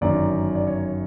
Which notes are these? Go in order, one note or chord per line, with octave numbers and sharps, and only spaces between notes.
G1 F#2 D#3 D5
D5
C#5